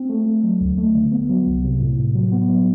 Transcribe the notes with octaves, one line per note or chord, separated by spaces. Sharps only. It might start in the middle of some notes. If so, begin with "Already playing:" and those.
Already playing: C4
A3
A3
F#3
D2
A3
D3
B3
F#3
C2
C3
A2
A2
F#3
B3
F#3